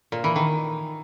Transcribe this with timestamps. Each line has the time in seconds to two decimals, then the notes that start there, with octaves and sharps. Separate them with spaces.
0.12 A#2
0.24 E3
0.36 D#3